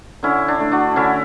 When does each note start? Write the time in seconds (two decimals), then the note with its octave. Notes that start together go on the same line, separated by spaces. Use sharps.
0.23 D3 C#4 E4
0.48 D4
0.60 A3
0.72 D4 F#4
0.96 D3 C#4 E4